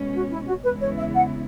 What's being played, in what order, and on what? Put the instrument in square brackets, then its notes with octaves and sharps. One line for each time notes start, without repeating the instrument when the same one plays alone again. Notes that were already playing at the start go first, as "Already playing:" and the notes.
Already playing: [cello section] B2 G#3 C#4
[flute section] F#4
E4
F#4
[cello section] E2 C#3 G#3 B3 E4 [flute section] B4
[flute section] C#5
E5
F#5